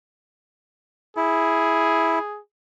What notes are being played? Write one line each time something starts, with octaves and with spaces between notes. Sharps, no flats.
E4 G#4